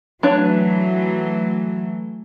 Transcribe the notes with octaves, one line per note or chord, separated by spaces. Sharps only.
E3 F#3 A3 D4 B4 C#5